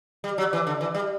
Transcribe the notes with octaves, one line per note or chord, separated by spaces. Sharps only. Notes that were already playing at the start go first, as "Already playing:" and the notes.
G3
F#3
E3
D3
E3
G3